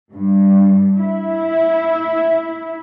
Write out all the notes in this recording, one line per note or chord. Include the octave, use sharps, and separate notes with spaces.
G2
E4